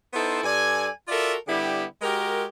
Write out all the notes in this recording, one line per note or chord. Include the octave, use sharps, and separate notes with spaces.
B3 D#4 E4 A4 C5
G2 A4 D5 G#5
F4 F#4 A4 A#4 D5 E5
D3 G3 B3 E4 G4
G#3 F#4 G4 A#4